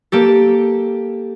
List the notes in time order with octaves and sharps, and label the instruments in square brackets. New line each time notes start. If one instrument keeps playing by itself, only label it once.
[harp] A#3 G4 A4